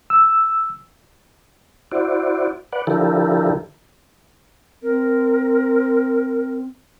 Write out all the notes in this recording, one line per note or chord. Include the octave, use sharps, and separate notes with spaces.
E6
E4 F#4 C5 D5
B4 D5 F#5
D3 F3 E4 G4 A4 A#4
C4 A#4